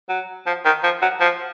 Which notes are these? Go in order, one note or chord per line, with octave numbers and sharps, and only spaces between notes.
F#3
F3
D#3
F3
F#3
F3